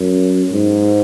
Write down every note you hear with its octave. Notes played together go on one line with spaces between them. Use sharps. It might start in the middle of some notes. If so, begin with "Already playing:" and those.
Already playing: F#2
G#2